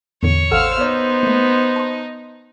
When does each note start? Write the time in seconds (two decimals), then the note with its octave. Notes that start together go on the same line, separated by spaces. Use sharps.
0.23 E2 A2 D3 C#5
0.51 A1 A4 C5 F5 F#5 E6 F6
0.81 B3 D#4 C#5
1.23 A3 A#3
1.76 A5 B5 C6